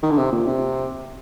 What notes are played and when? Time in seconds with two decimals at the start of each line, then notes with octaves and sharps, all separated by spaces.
0.03 D#3
0.10 D3
0.17 C3
0.32 A#2
0.47 C3